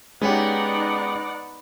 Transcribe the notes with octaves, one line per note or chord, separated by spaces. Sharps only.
G#3 B3 C#4 D#4 G4 D5 F#5